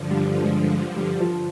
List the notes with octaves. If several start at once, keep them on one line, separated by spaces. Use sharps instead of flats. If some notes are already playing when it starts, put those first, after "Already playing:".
Already playing: G2 D3 F3
G3
G#3
G3
F3